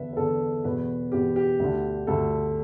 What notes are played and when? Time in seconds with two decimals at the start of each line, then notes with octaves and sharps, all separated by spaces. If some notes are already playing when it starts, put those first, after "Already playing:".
Already playing: E2 D3 B4 E5
0.13 B4
0.17 E2 D3 A4
0.64 E2 B2 B4
1.12 E2 B2 G4
1.36 G4
1.59 D2 D3
2.07 D2 D3 A4